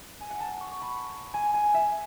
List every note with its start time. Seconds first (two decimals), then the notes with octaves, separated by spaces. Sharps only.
0.21 G#5
0.31 F#5
0.40 A5
0.61 C#6
0.71 C#6
0.81 B5
1.34 G#5
1.54 G#5
1.74 E5